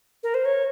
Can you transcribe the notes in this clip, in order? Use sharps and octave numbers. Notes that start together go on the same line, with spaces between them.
A#4
C5
C#5